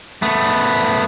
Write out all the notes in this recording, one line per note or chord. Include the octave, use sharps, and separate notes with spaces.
A3 B3